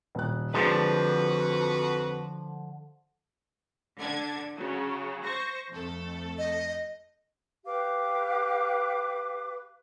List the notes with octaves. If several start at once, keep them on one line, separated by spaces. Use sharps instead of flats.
D#1 F#6
F2 D3 F3 G#3 F#4 B4
D3 D4 G#6
C#3 F#3
C5 C#6 A#6
F2 A3 A4
D#5
G4 B4 F5 D6